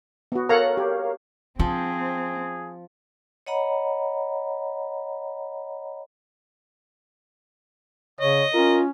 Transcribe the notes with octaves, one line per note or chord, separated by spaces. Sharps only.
B3 F#4
A4 A#4 C#5 F5 F#5 A#5
G4
F3 C4 F4 G#4
C#5 D#5 F#5 A#5 B5
C#3 C#5 D#5
C#4 F4 A#4